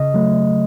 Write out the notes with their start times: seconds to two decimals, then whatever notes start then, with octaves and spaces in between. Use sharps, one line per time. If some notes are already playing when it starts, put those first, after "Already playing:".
Already playing: C#3 D#5
0.14 F#3 A3